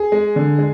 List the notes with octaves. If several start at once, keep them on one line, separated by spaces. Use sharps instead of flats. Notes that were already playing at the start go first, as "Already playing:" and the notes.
Already playing: G#4
G#3
D3
G#3